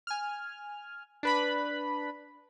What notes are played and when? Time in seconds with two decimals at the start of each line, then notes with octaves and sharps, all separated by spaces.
0.07 G#5 F6
1.23 D4 B4 B5